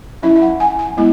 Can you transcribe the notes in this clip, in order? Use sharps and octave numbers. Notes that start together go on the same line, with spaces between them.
F#3 C#4 E4 E5
E5
F#5
G#5
G#5
G#3 B3 E4